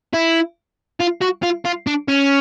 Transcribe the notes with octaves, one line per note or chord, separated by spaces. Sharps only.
E4
F4
F#4
F4
F4
D4
C#4